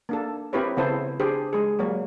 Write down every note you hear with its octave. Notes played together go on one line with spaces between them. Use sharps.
A#3 D4 A4
C4 E4 G4 A#4 B4 C#5
C#3 B3 C4 E4 A4 C5
D4 G4 G#4 C5
G#3 G#4
F#3 G3 A#3 C#5